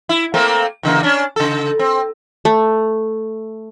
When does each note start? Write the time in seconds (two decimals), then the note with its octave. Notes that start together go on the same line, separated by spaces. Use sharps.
0.09 E4
0.34 A3 A#3 C4
0.83 E2 C#3 A#3
1.03 C#4 D4
1.36 C#3 A4
1.79 C4
2.45 A3